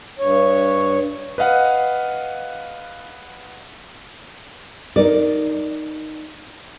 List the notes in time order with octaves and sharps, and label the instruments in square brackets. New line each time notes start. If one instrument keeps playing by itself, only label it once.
[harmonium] G2 C#5
[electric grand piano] B4 D#5 F5 F#5
[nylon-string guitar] D#4 A#4 D5